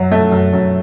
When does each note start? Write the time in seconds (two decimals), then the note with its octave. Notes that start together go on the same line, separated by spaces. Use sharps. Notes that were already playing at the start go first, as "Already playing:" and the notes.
Already playing: F#2 F#3
0.11 A3
0.32 F#2
0.53 F#2